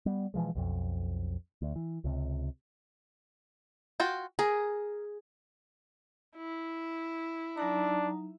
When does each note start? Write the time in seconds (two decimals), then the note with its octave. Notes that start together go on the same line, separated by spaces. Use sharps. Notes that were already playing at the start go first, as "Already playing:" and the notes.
0.06 G3 B3
0.34 B2 E3 F3 G#3
0.55 B1 F2
1.62 D2
1.76 E3
2.04 C#2 C3
4.00 F4 F#4 G5
4.39 G#4 A#4
6.36 E4
7.57 F#3 D4 D#4 A#5